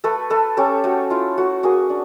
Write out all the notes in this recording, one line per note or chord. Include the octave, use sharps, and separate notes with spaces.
A3 A4 B4
A3 A4 B4
C#4 G4 A4
A3 F#4
E4 F4
A3 F#4
A#3 F#4 G#4
D4